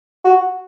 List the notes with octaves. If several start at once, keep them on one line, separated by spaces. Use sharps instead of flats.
F#4